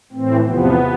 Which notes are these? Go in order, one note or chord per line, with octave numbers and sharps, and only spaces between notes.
A2 E3 C4
E2 C3 F3 B3